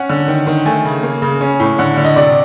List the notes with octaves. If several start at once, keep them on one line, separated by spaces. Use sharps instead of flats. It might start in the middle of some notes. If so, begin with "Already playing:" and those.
Already playing: C#4 F#5
D3
D#3
D#3
A3 G#5
C#3
A#3
C#3
C#4
A2
D3 F#5
D3
D#5
C3 D5